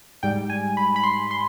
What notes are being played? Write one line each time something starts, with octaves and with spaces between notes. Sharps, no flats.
G#2 G3 G5
G#5
B5
B5
C6
C6